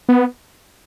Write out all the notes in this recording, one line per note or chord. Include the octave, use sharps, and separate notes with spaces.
B3